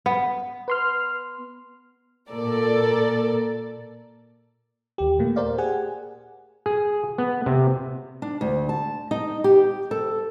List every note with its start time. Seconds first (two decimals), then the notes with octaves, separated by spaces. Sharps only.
0.06 B3
0.68 B4 C6 F6
2.30 A#2 A4 A#4 D5
4.98 D#2 G4
5.19 A#2 A3 A#3
5.36 A#4 C5 D5 F5
5.58 G4 G#4 F#5 G#5
6.66 G#4
7.18 B3
7.46 C3
8.22 D4
8.41 D2
8.69 A5
9.11 D#4
9.44 G4
9.91 A4